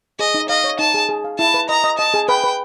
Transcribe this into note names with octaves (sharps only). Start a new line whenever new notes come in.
G#4 D#5
D#4
D#5 F5
C#5
D#4 A5
G#4
G#4
F5
E4 A5
B4
D#5 A#5
D#5
D#5 A5
G#4
B4 G5
B4